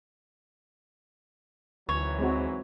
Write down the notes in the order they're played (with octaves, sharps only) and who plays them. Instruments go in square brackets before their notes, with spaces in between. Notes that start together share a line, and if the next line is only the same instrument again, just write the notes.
[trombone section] G#1 E3 F#3 [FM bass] D2 [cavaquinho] C#5
[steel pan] G#3 C4 F#4